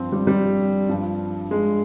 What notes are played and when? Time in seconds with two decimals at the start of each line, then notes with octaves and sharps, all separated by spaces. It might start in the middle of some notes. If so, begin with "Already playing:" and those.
Already playing: G2 F3 C4
0.12 G3
0.27 G3
0.89 G2 F3
1.51 G#3